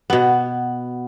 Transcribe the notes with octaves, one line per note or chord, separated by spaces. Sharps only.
B2 B3